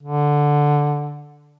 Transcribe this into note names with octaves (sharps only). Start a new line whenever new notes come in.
D3